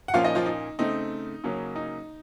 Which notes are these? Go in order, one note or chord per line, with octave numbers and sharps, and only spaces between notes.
F#5
A#2 F3 A#3 C#4 F4 F5
D#4 D#5
F3 F4
D#4
C#3 A3 C4 D#4
C#3 F#3 A#3 C#4
D#4